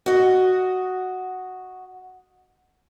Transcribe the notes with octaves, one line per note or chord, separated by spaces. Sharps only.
F#4 D#5